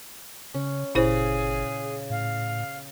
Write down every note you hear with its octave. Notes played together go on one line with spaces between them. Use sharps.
C#3 C#4
G1 A#2 C#3 E4 G#4 C5
A2 F5